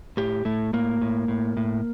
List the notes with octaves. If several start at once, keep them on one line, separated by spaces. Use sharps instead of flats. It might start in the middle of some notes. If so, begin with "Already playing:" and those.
A2 G4
A2 A3
A2 A#3
A2
A2
A2